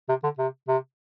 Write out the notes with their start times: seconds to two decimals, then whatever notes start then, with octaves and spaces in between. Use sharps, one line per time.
0.09 C3
0.24 D3
0.38 C3
0.68 C3